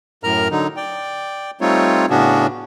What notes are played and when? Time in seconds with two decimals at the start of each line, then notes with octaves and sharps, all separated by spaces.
0.24 F#2 A2 A#4 A#5 F6
0.51 D3 F#3 D#4
0.77 D5 G5
1.61 G3 A3 C4 D#4 F4 C#5
2.10 A2 C#3 B3 C#4 D4 F#4